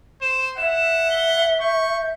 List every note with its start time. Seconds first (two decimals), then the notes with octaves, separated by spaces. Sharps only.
0.22 C5 E7
0.58 E5 F#5 E7
1.10 G7
1.61 C#6 G6